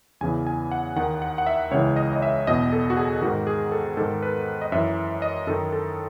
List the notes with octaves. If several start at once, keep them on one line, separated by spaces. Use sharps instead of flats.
E2 C#3 E3 G#5
G#5
F#5
D#2 D#3 F#5
F#5
F#5
E5
C#2 C#3 E3 C#5
D#5
D#5
E5
E2 B2 D#5
A4
F#4
G#4
G#2 D#3 F#4
G#4
A4
G#2 D#3 A4
B4
D#5
F#2 E3 E5
D#5
F#2 D#3 A4
A4